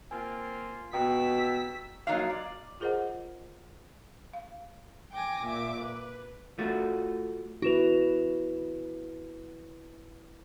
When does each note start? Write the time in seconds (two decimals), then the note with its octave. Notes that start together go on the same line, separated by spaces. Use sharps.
0.11 A#3 C4 F4 G#5
0.93 B2 G5 A#5 D#6 E6 B6
2.07 F3 F#3 A#3 D#4 F4 F5
2.30 D5
2.80 F4 G#4 A#4 C5 D#5 F#5
4.33 F5
5.13 G5 G#5 D6 A#6
5.45 A#2 E5 D6
5.78 B4
6.58 A3 F4 F#4
7.62 E4 F#4 B4 E7 F7